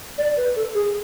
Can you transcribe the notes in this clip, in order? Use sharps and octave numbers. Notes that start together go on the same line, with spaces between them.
D5
B4
A4
G#4